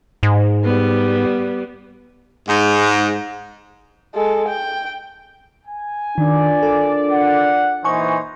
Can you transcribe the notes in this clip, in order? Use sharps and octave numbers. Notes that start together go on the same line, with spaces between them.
G#2
G3 B3
G#2
G#3 A4
G5
G#5
D#3 D4 F4 A#4 D5
A4
F#5
A#2 E3 D#4 C5 G#5 C#6